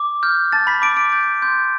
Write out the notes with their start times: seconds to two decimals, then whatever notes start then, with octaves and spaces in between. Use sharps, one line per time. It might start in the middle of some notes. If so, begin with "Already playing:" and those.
Already playing: D6
0.23 F6 G6
0.52 A5 A6
0.67 B5 B6
0.82 A5 D6 D7
0.97 D6 D7
1.12 G6 A6
1.42 C6 G6